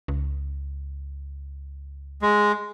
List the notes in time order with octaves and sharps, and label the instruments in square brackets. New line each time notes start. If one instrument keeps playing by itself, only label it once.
[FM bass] C#2
[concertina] G#3